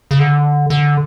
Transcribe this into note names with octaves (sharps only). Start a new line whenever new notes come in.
C#3
D3
D3